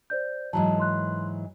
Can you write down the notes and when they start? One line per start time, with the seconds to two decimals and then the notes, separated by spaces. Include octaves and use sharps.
0.10 C5 D5 G6
0.53 G#2 E3 F#3 A5 A#5
0.78 B4 C6 F#6